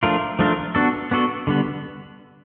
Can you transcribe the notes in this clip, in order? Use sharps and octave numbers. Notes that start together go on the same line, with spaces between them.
F3 A3 D4 F4 A#4
F3 A3 D4 F4 A#4
B3 D4 F#4 A4
B3 D4 F#4 A4
D3 G3 B3